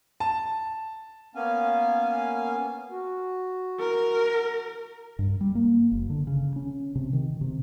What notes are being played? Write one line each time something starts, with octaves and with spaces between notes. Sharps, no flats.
A5
A#3 B3 C#4 F5 G#5
F#4
A#4
G2
G3
A#3
F#1
D3
C#3
C#4
C3
D#3
C3